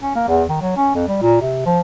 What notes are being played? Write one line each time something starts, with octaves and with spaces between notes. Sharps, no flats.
C#4
A#3
E2
D#3
F#3
C#4
F2
G3
A#2
C3
F3